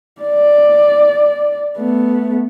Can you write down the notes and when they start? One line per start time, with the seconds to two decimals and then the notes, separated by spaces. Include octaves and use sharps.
0.22 D5
1.78 A3 B3